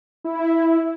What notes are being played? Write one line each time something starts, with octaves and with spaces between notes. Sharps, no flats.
E4